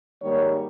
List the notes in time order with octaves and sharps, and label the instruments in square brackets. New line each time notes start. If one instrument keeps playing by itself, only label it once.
[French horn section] G#2 D#3 G3 A#3 C#5